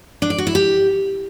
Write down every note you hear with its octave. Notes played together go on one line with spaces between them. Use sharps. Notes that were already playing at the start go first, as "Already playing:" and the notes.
D4
D5
F#4
E4
G4